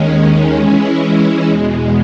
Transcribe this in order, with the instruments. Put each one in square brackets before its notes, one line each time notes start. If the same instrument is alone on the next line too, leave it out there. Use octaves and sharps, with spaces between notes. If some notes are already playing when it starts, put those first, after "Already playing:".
Already playing: [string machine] D#2 D#3 G#3 C#4
E3 G#3 C#4 E4
E2 B2 G#3